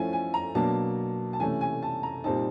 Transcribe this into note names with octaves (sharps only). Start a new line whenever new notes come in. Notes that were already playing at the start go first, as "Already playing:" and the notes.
Already playing: F3 A3 C#4 E4 G#5
G#5
A#5
B2 F#3 A#3 D4 A5
A5
C3 E3 A3 C#4 G#5
G#5
A5
A#5
A#2 G3 C4 D#4 A5